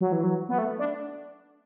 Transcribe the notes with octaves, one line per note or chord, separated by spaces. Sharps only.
F#3
E3
F#3
B3
A3
D4